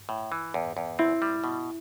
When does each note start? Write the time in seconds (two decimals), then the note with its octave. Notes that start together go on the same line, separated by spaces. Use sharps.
0.09 A2
0.32 E3
0.54 E2
0.77 E2
0.99 C4 E4
1.22 G3
1.44 B2